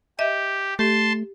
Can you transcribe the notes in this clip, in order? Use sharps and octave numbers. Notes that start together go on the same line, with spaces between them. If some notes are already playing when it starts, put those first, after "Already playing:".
G4 D#5 E5
A3 G4 A5 C6